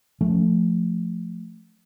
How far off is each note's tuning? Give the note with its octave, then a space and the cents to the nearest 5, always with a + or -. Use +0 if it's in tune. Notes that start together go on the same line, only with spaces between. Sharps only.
F3 +0 A3 +0 C#4 +0